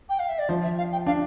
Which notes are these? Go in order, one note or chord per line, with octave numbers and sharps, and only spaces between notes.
G5
F5
E5
D5
F3 C5
E5
F5
G5
D4 F5